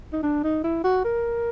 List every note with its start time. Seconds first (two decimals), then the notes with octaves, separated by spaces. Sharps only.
0.13 D#4
0.23 D4
0.43 D#4
0.64 E4
0.84 F#4
1.04 A#4